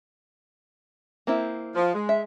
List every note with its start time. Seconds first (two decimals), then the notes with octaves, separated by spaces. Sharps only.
1.27 A#3 C4 E4
1.75 F3
1.94 G#3
2.09 E5